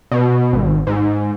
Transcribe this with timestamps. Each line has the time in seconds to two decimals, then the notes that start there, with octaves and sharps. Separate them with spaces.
0.11 B2
0.53 G#1
0.87 G#2